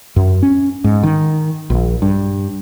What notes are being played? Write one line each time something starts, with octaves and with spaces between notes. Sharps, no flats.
F#2
C#4
G#2
D#3
A#1
G2